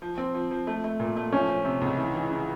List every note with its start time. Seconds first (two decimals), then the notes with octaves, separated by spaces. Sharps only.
0.02 F3
0.18 C4
0.35 F3
0.51 F3
0.67 A3
0.84 A3
1.00 A#2
1.17 A3
1.32 F3 C#4
1.49 F3
1.65 C3
1.81 C#2
1.98 E3
2.14 E3
2.30 C#3